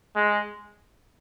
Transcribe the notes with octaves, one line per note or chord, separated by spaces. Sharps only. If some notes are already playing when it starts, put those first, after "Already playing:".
G#3